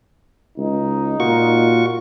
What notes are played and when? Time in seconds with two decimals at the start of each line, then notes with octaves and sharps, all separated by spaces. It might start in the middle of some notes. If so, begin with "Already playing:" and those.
0.58 C#2 D#4
1.20 A#2 F4 F#4 C#6